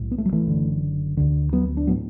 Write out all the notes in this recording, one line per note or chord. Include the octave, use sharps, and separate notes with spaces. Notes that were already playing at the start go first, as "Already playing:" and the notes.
Already playing: B1 A2
B3
A3
F#3
E3 A3
F#1 F#2 D3
D2 D3
F#3 B3
D4
A2 F#3 B3